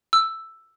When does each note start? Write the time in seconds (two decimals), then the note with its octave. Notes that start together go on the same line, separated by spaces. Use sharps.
0.13 E6